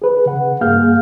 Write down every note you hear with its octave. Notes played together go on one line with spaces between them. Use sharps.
G#4 B4
C#3 F#5
G2 A#3 G#4 F5 F6 G6